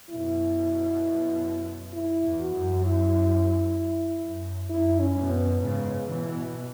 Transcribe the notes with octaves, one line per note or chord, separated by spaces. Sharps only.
F#2 B2 E4
E4
E2
F#4
F#2
E4
F#2
F#2 E4
C#4
F#2 B2
B3
G#2 C#3
B2 E3